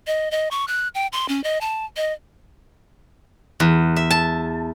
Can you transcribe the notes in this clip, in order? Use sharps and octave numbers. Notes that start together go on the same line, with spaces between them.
D#5
D#5
C#6
F#6
G5
C6
C#4
D#5
A5
D#5
E2
E5
A5